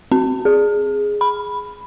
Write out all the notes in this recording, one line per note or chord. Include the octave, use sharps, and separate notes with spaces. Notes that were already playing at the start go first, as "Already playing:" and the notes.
C4
G#4
B5